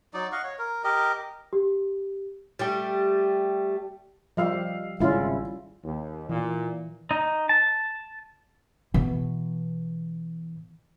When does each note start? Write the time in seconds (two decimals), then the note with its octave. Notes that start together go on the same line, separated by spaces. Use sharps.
0.14 F#3 D#4 D5
0.32 D#5 F5 F#5 C#6
0.44 C#5
0.59 A#4
0.84 G4 A#4 D#5
1.53 G4
2.59 G3 A3 G4
4.37 F3 G3 G4 D#5 F5 E6
5.00 G#1 C#3 G3 C#4 E4 F4
5.84 D#2
6.29 A#2 E3
7.11 D#4
7.49 A5
8.94 B2 E3